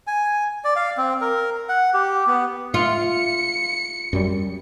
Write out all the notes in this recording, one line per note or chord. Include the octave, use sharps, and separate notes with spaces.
G#5
D5
F5
C4
A#4
F#5
G4
B3
F4 C#7
F#2 G3